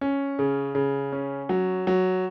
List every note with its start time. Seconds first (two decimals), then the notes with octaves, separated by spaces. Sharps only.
0.01 C#4
0.39 C#3
0.75 C#3
1.13 C#4
1.49 F#3
1.87 F#3